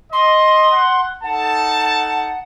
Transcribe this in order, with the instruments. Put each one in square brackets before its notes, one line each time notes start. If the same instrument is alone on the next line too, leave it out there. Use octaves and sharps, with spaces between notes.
[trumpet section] D#5 [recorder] C6
[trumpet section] F#5
[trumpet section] D#4 A4 A5 [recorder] F#5